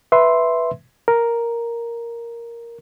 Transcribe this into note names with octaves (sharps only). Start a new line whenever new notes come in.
B4 E5 C6
A#4